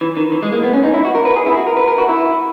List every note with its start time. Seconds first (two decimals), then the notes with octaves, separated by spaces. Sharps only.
0.01 E3
0.17 D#3
0.32 E3
0.43 G#3
0.52 A#3
0.63 B3
0.73 C#4
0.84 D#4
0.94 E4
1.05 F#4
1.15 A#4
1.25 B4
1.36 G#4
1.46 E4
1.57 F#4
1.67 A#4
1.77 B4
1.88 A#4
1.98 F#4
2.09 E4